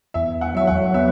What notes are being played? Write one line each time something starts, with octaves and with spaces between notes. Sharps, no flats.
E2 E5
F#5
F#3 E5
F#5
B3 E5